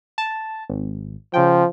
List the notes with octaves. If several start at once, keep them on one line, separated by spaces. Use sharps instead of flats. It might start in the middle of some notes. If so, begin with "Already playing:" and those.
A5
G#1
C#3 F3 G5